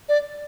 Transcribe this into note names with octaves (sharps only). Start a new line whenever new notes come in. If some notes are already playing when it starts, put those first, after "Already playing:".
D5